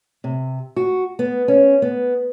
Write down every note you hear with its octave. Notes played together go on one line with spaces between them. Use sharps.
C3
F#4
B3
C#4
B3